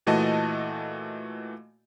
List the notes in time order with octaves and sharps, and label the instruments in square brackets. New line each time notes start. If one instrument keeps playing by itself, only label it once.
[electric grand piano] A#2 E3 A3 F#4 D#5 A5